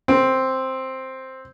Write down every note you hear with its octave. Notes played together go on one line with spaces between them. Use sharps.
C4